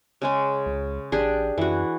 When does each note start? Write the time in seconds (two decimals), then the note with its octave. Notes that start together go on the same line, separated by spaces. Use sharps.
0.22 C#3 G#3 C#4
0.66 C#2
1.12 A1 D4 G4 G#4
1.58 F#2 E3 F#4